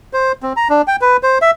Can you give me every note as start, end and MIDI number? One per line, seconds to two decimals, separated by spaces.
0.13 0.32 72
0.43 0.53 60
0.57 0.68 82
0.70 0.82 62
0.88 0.96 79
1.01 1.17 71
1.23 1.38 72
1.42 1.51 76